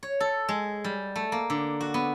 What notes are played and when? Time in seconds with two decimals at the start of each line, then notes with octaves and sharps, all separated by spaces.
0.03 C#5
0.20 A4
0.49 G#3
0.84 G3
1.16 A3
1.32 A#3
1.50 D3
1.81 F#4
1.94 B3